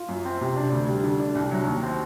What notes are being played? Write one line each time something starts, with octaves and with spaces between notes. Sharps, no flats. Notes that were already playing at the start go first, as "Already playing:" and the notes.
Already playing: F4
F#2
C4
C3
D4
D2
G3
D3
D4
C2
F#3
D#2
C4